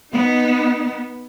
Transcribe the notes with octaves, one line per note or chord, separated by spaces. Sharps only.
B3 D#4